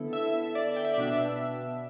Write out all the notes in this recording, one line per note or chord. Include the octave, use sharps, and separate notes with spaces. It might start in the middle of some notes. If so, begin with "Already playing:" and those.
Already playing: D3 B3 E4 A4
E5
D5
G5
E5
D5
B2 B3 D4 E5